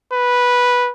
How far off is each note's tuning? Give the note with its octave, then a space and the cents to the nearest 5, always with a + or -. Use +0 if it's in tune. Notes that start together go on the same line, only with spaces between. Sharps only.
B4 -10